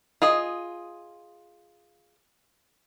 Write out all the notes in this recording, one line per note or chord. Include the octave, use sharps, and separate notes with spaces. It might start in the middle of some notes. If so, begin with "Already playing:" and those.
F4 G#4 D#5